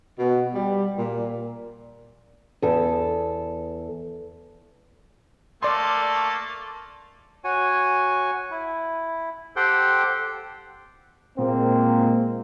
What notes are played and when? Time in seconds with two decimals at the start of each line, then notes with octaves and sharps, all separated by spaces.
0.19 B2
0.55 G3
0.98 A#2
2.62 E2 A4
5.63 A3 A#3 A4 D5 C6
7.44 F#4 C#5 G#5
8.51 E4
9.56 G4 A4 C5 F#5 G5
11.38 A#2 G#3 A#3 C4